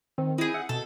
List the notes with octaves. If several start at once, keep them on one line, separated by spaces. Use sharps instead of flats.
D#3 C4
D#4 E4 G#4
E5 F#5
B2 A4